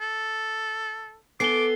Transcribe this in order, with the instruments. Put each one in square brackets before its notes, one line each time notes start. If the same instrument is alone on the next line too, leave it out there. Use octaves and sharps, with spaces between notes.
[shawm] A4
[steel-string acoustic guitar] B3 A4 G#5 [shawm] D6 [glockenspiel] C7 G7